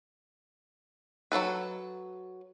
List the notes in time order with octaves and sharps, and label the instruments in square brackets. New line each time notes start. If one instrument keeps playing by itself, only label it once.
[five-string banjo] F#3 C4 A4 B4